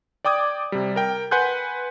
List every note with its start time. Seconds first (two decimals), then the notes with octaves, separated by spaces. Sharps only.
0.25 D5 G5 D6 D#6 G#6
0.72 C3 G3
0.96 A#4 G5
1.31 B4 F#5 G#5 C6 F#6 G6